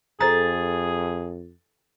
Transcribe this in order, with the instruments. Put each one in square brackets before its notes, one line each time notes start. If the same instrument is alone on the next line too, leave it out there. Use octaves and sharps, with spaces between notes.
[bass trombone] F2 [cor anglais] G#4 [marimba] A4 C5 A#5 [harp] A6